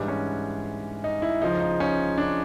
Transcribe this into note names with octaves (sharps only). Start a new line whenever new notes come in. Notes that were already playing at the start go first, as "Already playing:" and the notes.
Already playing: G#2 E3 G3 D4
C#4
D#4
E4
C#2 C#3 F3 D#4
D#4
C#4
D4